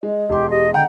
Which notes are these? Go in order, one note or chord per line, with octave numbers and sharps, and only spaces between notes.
G#3 D#5
E1 G#3 G4 C6
G4 D#5
D3 D#5 F#5 G5 A#5